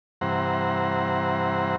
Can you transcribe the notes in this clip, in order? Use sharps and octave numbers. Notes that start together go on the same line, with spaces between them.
G2 C3 E3 C5 F#5 A#5